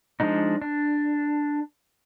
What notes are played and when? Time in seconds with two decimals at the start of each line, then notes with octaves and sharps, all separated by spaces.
0.20 F3 G#3 D4 D#4
0.62 D4